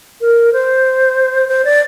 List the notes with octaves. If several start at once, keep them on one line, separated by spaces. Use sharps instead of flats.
A#4
C5
C5
D5